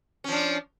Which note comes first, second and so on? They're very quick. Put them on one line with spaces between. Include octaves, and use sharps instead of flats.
C#4 F3 D4